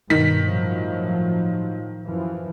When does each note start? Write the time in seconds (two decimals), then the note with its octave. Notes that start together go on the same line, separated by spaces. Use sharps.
0.10 G2 B2 D#3 B6
0.45 A2 F3 F#3
2.05 F#2 E3 F3